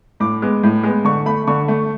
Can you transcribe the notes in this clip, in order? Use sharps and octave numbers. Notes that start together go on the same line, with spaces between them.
A2 D6
G#3 B3
A2
G#3 B3
D3 C#6
A3 B5
D3 C#6
A3